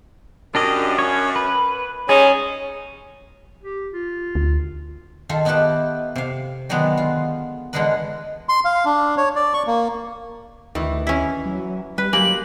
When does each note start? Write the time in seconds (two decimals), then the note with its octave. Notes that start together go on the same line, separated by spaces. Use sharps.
0.55 F#2 D4 G4 D#5
0.99 C#4 C#5
1.36 B4
2.09 G3 G#3 C#4 D#4 G#4
3.61 G4
3.93 F4
4.35 D2
5.29 D#3 F4 A4
5.45 B3 D#4 E4 G4 B4 A5
6.16 C3 F5
6.69 D3 D#3 F#3 G#3 B3 D#4
6.97 F4
7.73 D3 E3 G#3 G#4 A#4 B4
8.49 C6
8.65 F5
8.85 D4
9.17 C#5
9.35 D5
9.54 C#6
9.67 A#3
10.75 D2 D#3 E3
11.07 C#4 E4
11.46 F#3
11.98 G3 B4
12.13 F#3 G#3 A#3 G4 G#5 F#7